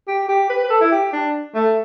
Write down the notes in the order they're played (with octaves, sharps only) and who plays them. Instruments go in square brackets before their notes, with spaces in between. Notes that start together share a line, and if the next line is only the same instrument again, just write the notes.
[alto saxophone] G4
G4
B4
B4
A4
E4
G4
D4
A3